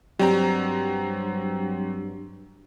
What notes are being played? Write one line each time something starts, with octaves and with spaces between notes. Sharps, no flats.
G2 F#3 G3 C4 A#5